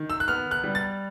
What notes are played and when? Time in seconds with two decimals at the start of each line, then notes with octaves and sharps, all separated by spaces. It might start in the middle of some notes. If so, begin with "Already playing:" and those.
Already playing: D#3
0.10 E6
0.20 F#6
0.28 B3 F6
0.51 F#6
0.64 G3
0.75 A6